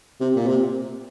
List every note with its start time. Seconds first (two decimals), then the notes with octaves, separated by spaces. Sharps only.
0.20 C3
0.36 A#2
0.47 C3